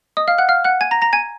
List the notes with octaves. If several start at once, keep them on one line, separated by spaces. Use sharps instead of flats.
D#5 D#6
F5 F6
F#5 F#6
F5 F6
F#5 F#6
G#5 G#6
A#5 A#6
A#5 A#6
G#5 G#6